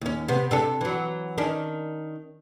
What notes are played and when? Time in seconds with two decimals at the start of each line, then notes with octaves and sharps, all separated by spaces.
0.01 D#2 C#4
0.28 C3 B3
0.51 C3 D4 A4
0.81 E3 F#3
1.38 D#3 C#4 D4